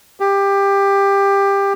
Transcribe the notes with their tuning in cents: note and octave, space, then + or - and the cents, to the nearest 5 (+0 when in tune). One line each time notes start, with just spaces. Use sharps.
G4 +15